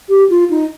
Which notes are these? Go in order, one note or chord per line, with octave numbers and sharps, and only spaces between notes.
G4
F4
D#4